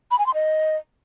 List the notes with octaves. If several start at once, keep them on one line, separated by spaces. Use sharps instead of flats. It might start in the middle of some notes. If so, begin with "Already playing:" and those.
B5
G#5
C6
D#5